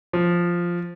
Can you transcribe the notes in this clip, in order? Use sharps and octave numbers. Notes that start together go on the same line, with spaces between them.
F3